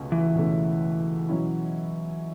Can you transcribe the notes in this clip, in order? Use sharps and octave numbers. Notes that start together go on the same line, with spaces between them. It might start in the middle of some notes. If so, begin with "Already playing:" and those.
Already playing: C#2 B2 A3 C#4
E3
C#2 B2 A3 C#4
B2 F#3 C#4 E4